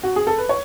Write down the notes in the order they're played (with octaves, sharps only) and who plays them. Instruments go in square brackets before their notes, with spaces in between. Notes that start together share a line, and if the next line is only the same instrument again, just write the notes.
[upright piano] F#4
G#4
A4
B4
C#5